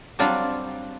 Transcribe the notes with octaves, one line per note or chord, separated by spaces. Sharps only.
F#3 G3 C4 D4 F4